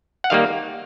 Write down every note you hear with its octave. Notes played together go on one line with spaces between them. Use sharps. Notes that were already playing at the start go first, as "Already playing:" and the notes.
F#5
D#3 G3 A#3 F5